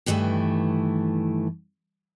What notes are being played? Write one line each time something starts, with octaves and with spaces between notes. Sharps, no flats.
G2 D#3 E3 G3 A3